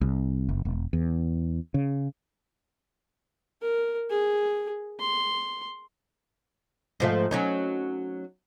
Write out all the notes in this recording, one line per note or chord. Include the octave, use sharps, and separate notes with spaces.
C2
F#1
E1
E2
C#3
A#4
G#4
C6
G#2 F3 A3
F#3 C#4 D#4